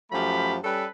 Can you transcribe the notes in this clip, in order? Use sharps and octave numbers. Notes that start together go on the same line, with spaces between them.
F#2 F3 A3 G4 B5
G3 C#4 A4 B4